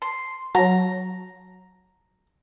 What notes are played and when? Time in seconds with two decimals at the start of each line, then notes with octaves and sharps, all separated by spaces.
0.02 C6
0.55 F#3 A#5